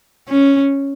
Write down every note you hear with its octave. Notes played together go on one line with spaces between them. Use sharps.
C#4